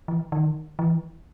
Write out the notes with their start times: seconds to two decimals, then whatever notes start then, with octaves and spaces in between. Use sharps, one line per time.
0.08 E3
0.32 D#3
0.79 E3